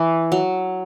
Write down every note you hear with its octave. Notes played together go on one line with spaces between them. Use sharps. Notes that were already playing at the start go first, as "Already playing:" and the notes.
Already playing: E3
F#3